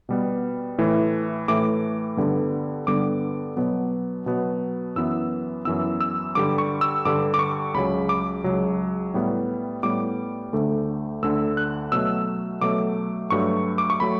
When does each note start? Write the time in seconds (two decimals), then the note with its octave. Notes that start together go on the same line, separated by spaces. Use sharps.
0.09 B2 G3 B3
0.78 A2 E3 A3
1.48 A2 E3 A3 D6
2.17 G2 D3 G3 B3
2.87 G2 D3 G3 B3 D6
3.57 B2 F#3 B3
4.26 B2 F#3 B3
4.96 F#2 E3 B3 E6
5.65 F#2 E3 B3 E6
6.01 E6
6.35 G2 D3 G3 D6
6.58 C#6
6.81 E6
7.05 G2 D3 G3 D6
7.34 D6
7.39 C#6
7.74 C#2 C#3 F#3 B5
8.09 D6
8.44 C#2 C#3 F#3
9.14 A2 G3 B3
9.83 A2 G3 B3 D6
10.53 D2 D3 A3
11.22 D2 D3 A3 E6
11.57 F#6
11.92 B2 F#3 A3 E6
12.61 B2 F#3 A3 D6
13.30 G2 F#3 A3 C#6
13.78 D6
13.90 C#6
14.00 F#3 A3 B5